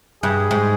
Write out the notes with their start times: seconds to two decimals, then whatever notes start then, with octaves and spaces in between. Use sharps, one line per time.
0.23 G2 G#4
0.51 G#2